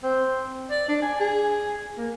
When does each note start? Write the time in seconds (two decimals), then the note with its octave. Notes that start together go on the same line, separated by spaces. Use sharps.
0.03 C4
0.71 D5
0.88 D4
1.02 G#5
1.20 G#4
1.98 A#3